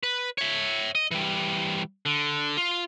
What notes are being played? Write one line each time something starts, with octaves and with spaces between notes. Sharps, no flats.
B4
C#5 E5
D#5
E3 G3
D3
F4